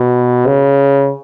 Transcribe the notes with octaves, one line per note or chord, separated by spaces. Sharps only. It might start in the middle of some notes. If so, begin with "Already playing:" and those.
Already playing: B2
C#3